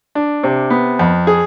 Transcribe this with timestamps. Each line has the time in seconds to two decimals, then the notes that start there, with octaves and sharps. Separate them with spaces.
0.15 D4
0.44 C3
0.70 B3
0.99 F2
1.27 G#4